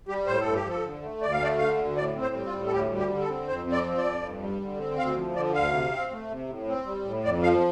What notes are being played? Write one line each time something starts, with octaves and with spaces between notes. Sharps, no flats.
G3 G4
A2 C5
A4
G2
G4
F3 A4
D3
A3
D2 D5
F5
A3 D5
D3 F5
D2
A2 D5
C4
C5
G3
F4
A2
A4
D2 G4
G3
G4
D3
A4
C4
F2 C5
C4
D5
F3
D5
F2
G2
G3
D3
C4
D2 F5
F3
D3 D5
D2 F5
C3
C4
A3
C3
A2
C4
G3
A2
F2 D5
F3 F5